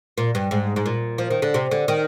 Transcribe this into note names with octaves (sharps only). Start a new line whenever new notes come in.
A#2
G2
G#2
G#2
A#2
F3
D#3
D3
C3
D3
D#3